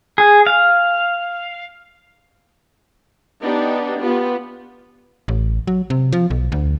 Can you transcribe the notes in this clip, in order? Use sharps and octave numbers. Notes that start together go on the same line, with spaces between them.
G#4
F5
B3 D4 D#4 G4
B3 F4 G4
A1
F#3
C3
F3
B1
D2